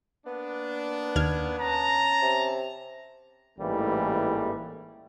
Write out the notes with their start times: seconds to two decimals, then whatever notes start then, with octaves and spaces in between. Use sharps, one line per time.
0.27 A#3 B3 D4
1.16 D#2 F6 G#6
1.58 C#4 A5 A#5
2.22 C3
3.59 A1 G#2 E3 G3 A3 A#3